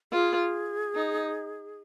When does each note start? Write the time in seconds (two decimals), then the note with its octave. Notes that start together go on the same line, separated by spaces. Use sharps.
0.12 F4 G#4
0.95 D#4